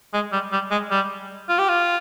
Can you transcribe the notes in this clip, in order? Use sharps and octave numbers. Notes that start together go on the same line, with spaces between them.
G#3
G3
G3
G#3
G3
F4
G4
F4